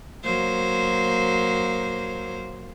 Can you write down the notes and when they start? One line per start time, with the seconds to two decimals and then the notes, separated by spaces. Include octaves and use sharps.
0.24 F#3 A#3 C5